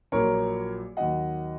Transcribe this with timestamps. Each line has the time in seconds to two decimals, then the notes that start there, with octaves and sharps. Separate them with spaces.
0.12 A#1 A#2 F#3 A#4 C#5
0.97 D#2 D#3 F#3 D#5 F#5